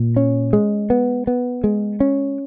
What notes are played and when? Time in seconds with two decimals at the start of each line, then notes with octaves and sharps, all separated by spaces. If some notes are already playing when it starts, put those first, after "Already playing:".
Already playing: A#2
0.16 C#4
0.53 G#3
0.90 B3
1.27 B3
1.64 G#3
2.00 C#4